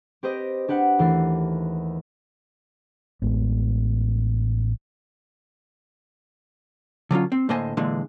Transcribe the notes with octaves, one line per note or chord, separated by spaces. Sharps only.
C4 G4 B4 C5 D#5
D4 G4 B4 F#5
D#2 E3 A3 A6 C7
A1 G#3 B3
D3 F#3 C#4 F4
C4
A2 D3 A#3 C5 D#5 G#5
A#2 D3 E3 G#3